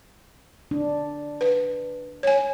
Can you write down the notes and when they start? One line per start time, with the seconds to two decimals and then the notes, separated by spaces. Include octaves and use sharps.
0.71 D4
1.41 B4
2.23 C#5 G#5